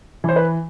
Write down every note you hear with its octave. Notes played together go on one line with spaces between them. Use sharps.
E3 C5
B4